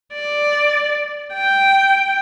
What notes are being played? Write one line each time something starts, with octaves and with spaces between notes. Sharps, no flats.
D5
G5